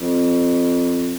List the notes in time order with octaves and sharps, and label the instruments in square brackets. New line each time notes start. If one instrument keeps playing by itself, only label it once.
[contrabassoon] F2